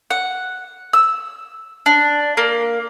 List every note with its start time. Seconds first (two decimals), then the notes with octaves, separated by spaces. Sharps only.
0.10 F#5
0.93 E6
1.86 D4
2.37 A#3